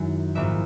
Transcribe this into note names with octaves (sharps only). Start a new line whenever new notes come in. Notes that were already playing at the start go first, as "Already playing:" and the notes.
Already playing: F#2 D#3 G#3 C#4 E4
A#1 G#2 E3 E5